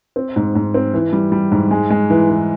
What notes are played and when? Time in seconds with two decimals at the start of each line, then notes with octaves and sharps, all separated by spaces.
0.16 C4
0.36 G#2
0.55 G#2
0.74 C4
0.94 E3
1.13 G3
1.32 G3
1.52 G#2
1.71 G#3
1.90 G#3
2.10 E3
2.29 E3